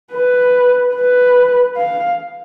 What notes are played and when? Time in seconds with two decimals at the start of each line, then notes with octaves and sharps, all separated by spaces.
0.12 B4
0.95 B4
1.77 F5